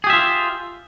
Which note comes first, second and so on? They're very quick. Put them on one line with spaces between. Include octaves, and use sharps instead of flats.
G#4 G4 E5 F4